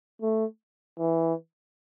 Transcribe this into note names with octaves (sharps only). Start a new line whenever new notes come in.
A3
E3